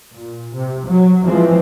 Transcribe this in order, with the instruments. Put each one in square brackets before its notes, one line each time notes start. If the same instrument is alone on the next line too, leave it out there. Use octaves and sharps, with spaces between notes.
[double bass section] A#2
C3
F#3
E3 F3 G#3 C4